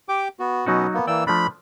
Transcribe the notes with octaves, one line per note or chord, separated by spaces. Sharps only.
G4 G5 D6
B3 F#4
B2 F#3 B3 C#4 D#4 F#4
A#3 B3
E3 A#3 D5 G5 E6
F3 A3 D4 B5